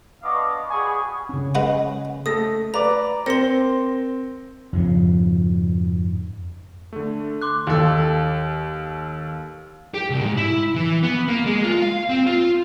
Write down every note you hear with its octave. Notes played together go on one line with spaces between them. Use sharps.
B3 D4 D#5 F5 C#6 D6
G3 F#4 G#4 G#5 B5 C#6
C#3 C#4
G#3 B4 F#5
A3 D#6 A#6
B4 D5 A#5 D6
C4 A#4 C6 A#6 C#7
F2 G#2 C#3
D3 A3
C6 D6 F#6
D#2 A4
G4
C2
G#2
E4
E3
B3
A#3
G#3
F4
F5
C4
F4